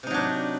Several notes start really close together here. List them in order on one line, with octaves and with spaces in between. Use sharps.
C3 D#4 F#3 D4